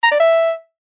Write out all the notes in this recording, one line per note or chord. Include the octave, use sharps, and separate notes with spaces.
A#5
D5
E5